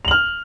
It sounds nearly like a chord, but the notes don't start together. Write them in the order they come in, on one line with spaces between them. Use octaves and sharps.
F7 F#7 F6